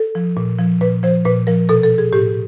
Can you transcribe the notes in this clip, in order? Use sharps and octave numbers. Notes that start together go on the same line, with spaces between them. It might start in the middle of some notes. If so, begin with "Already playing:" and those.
Already playing: A4
F3
A#2
F3
A#2 B4
F3 C5
A#2 B4
F3 A#4
B2 A4
A4
G#4
A2 G4